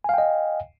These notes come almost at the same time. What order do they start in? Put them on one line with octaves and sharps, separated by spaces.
G#5 F5 G5 D#5